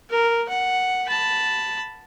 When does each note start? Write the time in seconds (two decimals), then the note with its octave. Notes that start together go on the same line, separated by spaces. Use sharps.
0.10 A#4
0.49 F#5
1.07 A5 B5